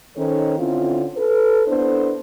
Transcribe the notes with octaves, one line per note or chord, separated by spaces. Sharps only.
D#3 C#4 D#4 A4 C5 C#5
D3 C4 C#4 E4 F4
A4 B4
B3 D4 E4 A4 C5